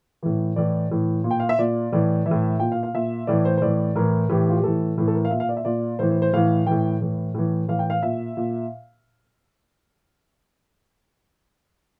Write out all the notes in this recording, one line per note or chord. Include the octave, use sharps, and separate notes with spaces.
A2 E3
A2 E3 D5
A2 E3
A#2
G5
F5
E5
A#2 D5
A2 E3 D5
E3 E5
A2
A#2 G5
F5
F5
A#2 E5
A2 E3 D5
C5
C5
A2 E3 D5
A2 E3 A#4
A2 E3 G4
F4
G4
A2 E3 A4
A2 E3
A4
A#4
F5
A#2 E5
F5
D5
E5
A#2 D5
A2 E3 C5
C5
C5
A2 E3 F5
A2 E3 G5
A2 E3
A2 E3
A2 E3 F5
G5
F5
A#2 E5
A#2